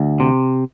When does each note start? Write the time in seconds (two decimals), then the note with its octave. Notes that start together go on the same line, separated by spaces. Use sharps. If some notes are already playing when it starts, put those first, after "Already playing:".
Already playing: D2
0.20 C3